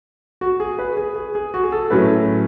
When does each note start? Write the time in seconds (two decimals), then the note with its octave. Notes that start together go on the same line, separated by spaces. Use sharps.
0.41 F#4
0.60 G#4
0.79 B4
0.97 G#4
1.16 G#4
1.35 G#4
1.54 F#4
1.63 G#4
1.72 A4
1.90 A2 F#3 C#4 B4